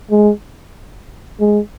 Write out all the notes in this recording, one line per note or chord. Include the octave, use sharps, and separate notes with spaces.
G#3
G#3